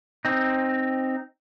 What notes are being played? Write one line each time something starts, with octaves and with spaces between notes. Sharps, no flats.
C4 D#4